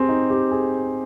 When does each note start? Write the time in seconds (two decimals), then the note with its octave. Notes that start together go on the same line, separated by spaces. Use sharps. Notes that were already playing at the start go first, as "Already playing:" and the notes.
Already playing: C4 G4 G#4
0.09 D#4
0.30 G4
0.51 G#4